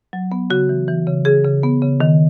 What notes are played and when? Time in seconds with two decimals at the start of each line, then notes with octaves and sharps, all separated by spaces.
0.13 F#3
0.32 B3
0.50 C#3 F#4
0.69 E3
0.88 E3
1.07 C#3
1.25 C#3 G#4
1.44 C#3
1.63 B3
1.82 C#3
2.01 D#3